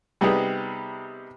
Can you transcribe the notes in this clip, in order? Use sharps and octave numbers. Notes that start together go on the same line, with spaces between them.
C3 G3 B3 D#4 G4 G#4